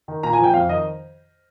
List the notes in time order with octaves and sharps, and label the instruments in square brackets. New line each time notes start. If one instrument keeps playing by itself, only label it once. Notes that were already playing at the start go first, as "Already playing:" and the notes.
[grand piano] D#3
A#2 A#5
G#5
F3
G5
F2 F5
D#3 D#5